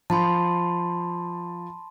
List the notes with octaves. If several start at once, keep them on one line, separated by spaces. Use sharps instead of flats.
F3 A5 B5 C6